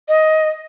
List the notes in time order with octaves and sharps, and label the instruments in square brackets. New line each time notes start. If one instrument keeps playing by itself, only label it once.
[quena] D#5